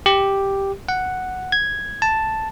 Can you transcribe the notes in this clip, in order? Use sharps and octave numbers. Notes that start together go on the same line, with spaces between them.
G4
F#5
G#6
A5